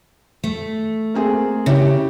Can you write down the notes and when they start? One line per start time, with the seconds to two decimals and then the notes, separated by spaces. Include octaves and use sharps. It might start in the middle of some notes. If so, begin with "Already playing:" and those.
0.44 A3
1.14 A#3 C4 G#4
1.66 C#3 E4 G4